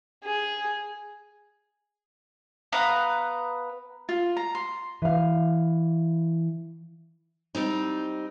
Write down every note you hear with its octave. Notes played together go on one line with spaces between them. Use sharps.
G#4
B3 B4 F5 A#5
F4
A#5
C6
E3 F5
G3 C4 D#4